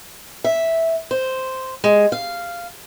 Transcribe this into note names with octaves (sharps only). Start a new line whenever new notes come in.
E5
C5
G#3
F5